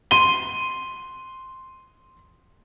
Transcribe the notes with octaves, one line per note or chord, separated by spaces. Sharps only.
C6 D#7 G7